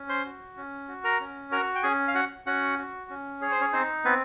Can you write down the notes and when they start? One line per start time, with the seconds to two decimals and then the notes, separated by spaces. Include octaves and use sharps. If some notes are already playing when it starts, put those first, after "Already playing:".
Already playing: C#4
0.09 C5 C6
0.25 F#4
0.57 C#4
0.88 F#4
1.04 A#4 A#5
1.20 C#4
1.51 F#4 A#4 A#5
1.76 G5
1.83 C#4 G#4 G#5
2.08 F5
2.14 F#4 F#5
2.46 C#4 F#4 F#5
2.78 F#4
3.10 C#4
3.41 G#4 C#5
3.51 C5
3.61 C#4 C#5
3.72 C4 D#4 C5
4.05 B3 C4 B4